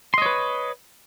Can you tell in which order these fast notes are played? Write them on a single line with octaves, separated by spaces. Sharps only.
C6 D#5 C#5 B4